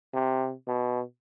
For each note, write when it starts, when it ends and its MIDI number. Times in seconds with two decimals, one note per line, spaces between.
0.14 0.53 48
0.68 1.01 47